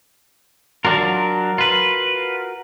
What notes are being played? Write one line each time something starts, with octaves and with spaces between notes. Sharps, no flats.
F#3 D4 F4 F#4 A#4
F4 B4